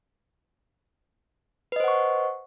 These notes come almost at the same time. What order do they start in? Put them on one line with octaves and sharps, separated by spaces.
B4 D#5 C5 F#5 C#6